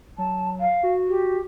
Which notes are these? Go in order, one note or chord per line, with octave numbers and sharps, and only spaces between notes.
F#3 A5
F5
F#4
G4